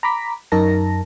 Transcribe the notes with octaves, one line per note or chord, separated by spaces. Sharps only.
A#5 B5 D6 B6
F#2 D#4 A#4 A5 A#6